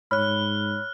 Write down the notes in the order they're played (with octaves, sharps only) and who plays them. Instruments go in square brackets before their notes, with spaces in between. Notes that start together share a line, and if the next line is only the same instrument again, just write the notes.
[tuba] G#2 [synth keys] C#5 B5 [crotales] F6 F#6